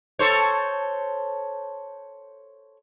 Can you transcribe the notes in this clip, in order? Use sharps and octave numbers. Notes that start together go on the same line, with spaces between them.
A4 C5 C#5